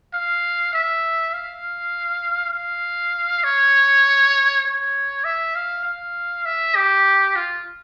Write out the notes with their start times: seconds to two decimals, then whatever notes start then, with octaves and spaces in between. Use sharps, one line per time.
0.14 F5
0.74 E5
1.34 F5
2.54 F5
3.44 C#5
4.65 C#5
5.24 E5
5.56 F5
5.85 F5
6.45 E5
6.76 G4
7.36 F4